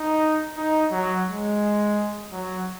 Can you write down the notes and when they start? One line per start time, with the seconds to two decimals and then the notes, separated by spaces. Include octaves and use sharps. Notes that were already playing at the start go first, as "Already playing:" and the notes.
Already playing: D#4
0.57 D#4
0.91 F#3
1.27 G#3
2.32 F#3